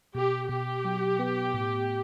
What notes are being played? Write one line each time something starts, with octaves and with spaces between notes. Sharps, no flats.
B2 G4
B2 G4
F#3
B3
A2